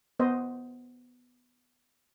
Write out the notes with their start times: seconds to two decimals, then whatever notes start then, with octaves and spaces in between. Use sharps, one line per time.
0.20 B3 C5 D#5